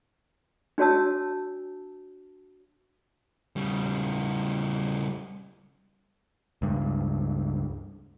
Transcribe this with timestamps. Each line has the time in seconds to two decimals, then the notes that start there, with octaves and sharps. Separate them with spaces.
0.78 D4 F#4 C#5 A5 E6
3.56 C#3 G3
6.62 C#2 G2